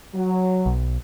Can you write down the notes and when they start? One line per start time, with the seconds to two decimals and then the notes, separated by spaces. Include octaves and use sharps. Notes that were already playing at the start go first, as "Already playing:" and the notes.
0.15 F#3
0.66 B1